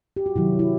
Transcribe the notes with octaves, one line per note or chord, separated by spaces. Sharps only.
G4
F#4
C3 D#3 F#3 E4
E4